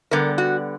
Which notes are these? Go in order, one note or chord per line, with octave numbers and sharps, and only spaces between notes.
D3 G3 B3 A#4
F#4